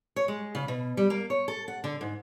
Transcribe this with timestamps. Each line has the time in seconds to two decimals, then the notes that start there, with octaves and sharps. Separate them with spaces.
0.16 C#5
0.28 G#3
0.55 C#3
0.68 B2
0.97 G3
1.10 A#3
1.30 C#5
1.48 A4
1.68 F#5
1.84 D3
2.01 G#2